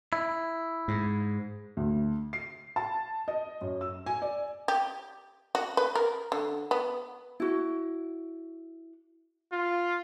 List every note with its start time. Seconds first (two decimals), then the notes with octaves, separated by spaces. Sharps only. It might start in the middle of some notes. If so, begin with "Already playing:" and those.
0.13 E4
0.88 G#2
1.77 D2
2.33 C7
2.76 A5
3.28 D#5
3.61 F#2
3.81 E6
4.06 G#5
4.22 D5
4.68 G4
5.55 F#4
5.77 B4
5.95 A#4
6.32 D3
6.71 B3
7.40 E4 F#4
9.52 F4